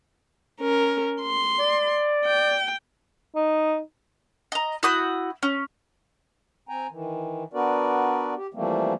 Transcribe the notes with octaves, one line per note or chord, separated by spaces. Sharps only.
C#4 A#4
C6
D5
G5
D#4
D#5 A#5
E4 F#4 D#6 G6
C#4
C4 G5 G#5 A#5
D#3 E3
B3 D4 F#4 A#4 B4 D5
G4
E3 F3 G3 A3 A#3 C4